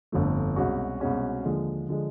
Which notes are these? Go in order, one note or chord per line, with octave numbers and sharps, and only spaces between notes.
G1 F2 D3 F3 A3
C2 B2 G#3 C#4 F#4
C2 B2 G#3 C#4 F#4
D#2 D3 F3 G#3
D3 F3 G#3